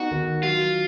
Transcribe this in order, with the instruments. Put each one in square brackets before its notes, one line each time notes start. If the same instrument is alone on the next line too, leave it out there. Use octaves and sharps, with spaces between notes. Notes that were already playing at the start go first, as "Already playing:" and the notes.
Already playing: [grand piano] B3 D#4 [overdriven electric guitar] F#4
[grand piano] D#3
[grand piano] F#3 [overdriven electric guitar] F4